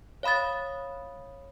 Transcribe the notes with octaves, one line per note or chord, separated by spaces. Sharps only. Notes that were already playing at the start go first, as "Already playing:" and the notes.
C#5 F5 B5 D#6 A6